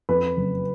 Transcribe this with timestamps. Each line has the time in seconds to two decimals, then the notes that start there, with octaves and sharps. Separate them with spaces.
0.09 F2 B4
0.37 F#1